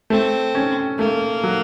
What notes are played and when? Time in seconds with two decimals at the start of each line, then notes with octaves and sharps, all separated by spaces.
0.10 A3 C4
0.55 C#4
0.99 A3 A#3
1.43 F#3